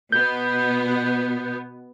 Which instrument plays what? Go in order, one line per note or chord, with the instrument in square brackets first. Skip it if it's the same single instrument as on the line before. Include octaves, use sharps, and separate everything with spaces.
[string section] B2 B3 [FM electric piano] G6